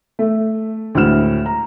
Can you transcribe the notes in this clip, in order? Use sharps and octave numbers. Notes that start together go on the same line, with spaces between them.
A3
D2 A2 G#3 F6 E7
A#5